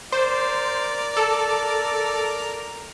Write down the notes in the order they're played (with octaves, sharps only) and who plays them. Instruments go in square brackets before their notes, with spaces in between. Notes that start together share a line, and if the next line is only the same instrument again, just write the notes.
[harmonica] A#4 D5 [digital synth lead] C5
[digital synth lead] A4